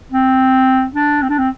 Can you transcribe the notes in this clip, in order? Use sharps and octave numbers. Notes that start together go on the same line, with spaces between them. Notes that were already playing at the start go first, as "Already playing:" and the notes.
C4
D4
C4
D4
C4